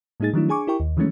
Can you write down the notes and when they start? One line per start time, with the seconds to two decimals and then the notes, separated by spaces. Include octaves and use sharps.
0.20 A2 G#3 A#3 D#4 G#4 A6
0.33 D#3 F3 F#3 A3 D4 E4
0.49 D4 G#4 G#5 C#6 D6
0.67 E4 G4 A#4 G5 C#6
0.80 D#2
0.97 D#3 E3 F#3 G#3 A3 C#4